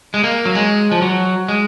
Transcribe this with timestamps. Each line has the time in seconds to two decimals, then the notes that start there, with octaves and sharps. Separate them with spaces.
0.14 G#3
0.24 A#3
0.45 F#3
0.55 G#3
0.92 F3
1.02 F#3
1.48 G#3